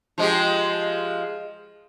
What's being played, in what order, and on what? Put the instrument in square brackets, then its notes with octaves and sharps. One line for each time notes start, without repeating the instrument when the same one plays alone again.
[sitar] F3 G#3 G4